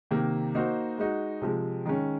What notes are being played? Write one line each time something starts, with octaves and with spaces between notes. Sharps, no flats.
C3 D#3 A#3
A#3 D#4 F#4 C5
G#3 D#4 F#4
C3 F3 G#3
D#3 G#3 C#4